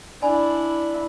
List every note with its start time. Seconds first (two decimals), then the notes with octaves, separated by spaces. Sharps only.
0.22 D4 E4 D5 G#5 B5